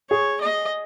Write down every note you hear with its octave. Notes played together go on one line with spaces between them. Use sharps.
G#4 C#5
D#5